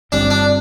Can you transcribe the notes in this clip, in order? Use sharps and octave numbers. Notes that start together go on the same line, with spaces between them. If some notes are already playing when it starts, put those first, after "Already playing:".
G1 G2 G3 C4 D4
D4